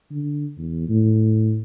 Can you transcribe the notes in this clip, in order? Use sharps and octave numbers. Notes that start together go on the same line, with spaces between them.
D3
E2
A2